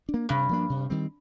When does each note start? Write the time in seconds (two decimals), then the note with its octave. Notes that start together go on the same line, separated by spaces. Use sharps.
0.09 D4
0.14 A#3
0.29 G2 C3
0.49 F3 A#3 D4
0.70 C3
0.90 D#3 G3 C4